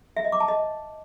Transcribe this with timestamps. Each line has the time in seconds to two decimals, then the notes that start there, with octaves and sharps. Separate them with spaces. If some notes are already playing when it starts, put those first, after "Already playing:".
0.17 E5
0.24 D#5
0.32 D6
0.40 A5
0.48 D#5